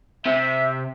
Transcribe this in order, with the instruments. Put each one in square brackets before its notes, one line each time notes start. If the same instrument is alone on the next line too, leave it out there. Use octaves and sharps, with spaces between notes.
[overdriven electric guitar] C3 [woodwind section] E5